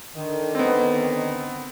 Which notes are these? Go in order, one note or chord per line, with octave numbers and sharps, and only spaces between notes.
D3 D#3
B3 C4